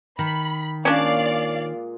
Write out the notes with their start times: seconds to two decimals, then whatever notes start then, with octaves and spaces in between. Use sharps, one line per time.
0.19 D#3 B5
0.85 A#2 G#3 C#4 D4 D5 F5